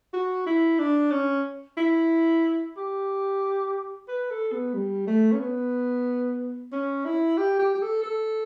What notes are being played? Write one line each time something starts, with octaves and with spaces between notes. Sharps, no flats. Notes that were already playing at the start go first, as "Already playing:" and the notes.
F#4
E4
D4
C#4
E4
G4
B4
A4
B3
G3
A3
C#4
B3
C#4
E4
G4
G4
G4
A4
A4